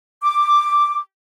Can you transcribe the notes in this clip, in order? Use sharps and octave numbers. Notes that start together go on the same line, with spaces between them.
D6